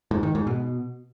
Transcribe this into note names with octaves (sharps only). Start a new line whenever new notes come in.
G#2
D#3
G#2
B2